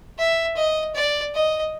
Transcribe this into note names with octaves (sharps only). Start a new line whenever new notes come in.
E5
D#5
D5
D#5